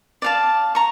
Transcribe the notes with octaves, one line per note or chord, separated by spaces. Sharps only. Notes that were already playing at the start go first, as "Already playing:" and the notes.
D5 F5 A5
A#5 C#6